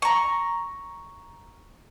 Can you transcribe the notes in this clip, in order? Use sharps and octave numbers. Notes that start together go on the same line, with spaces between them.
A#5 C#6